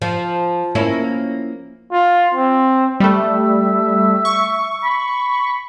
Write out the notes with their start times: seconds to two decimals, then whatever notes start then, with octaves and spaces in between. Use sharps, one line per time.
0.02 F3
0.75 A#3 C#4 E4
1.92 F4
2.35 C4
3.00 G3 A3 E5
4.25 C#6
4.83 B5